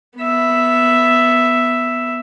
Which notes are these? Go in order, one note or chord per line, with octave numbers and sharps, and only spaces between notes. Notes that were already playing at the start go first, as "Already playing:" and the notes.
B3 E5